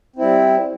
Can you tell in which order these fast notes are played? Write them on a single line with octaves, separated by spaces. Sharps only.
C4 E4 G3